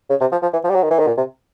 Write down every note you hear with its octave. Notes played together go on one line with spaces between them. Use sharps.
C#3
C3
F3
F3
E3
F3
G3
F#3
D#3
E3
D#3
A#2
C3